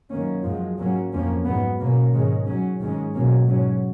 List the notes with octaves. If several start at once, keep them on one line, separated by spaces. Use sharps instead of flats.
F#2 D#3 A#3 C#4
F#2 F3 G#3
G#2 F#3 A#3 C#4
F2 F3 A#3 C#4
G#2 F#3 B3
B2 A#3 C#4
G#2 D#3 G#3 C#4
G#2 F#3 C#4
G#2 D#3 G#3 C#4
B2 F#3 A#3 C#4
G#2 F#3 C#4